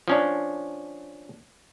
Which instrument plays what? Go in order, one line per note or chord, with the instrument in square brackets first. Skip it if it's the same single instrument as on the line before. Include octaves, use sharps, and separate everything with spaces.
[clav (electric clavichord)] F3 C#4 D4